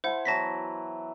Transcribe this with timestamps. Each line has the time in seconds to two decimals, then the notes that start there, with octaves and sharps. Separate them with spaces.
0.04 E4 C5 F#5 A5 C6
0.25 E3 F#3 B3 A5 A#6 B6